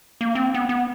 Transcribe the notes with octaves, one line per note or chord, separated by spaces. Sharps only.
A#3
C4
B3
B3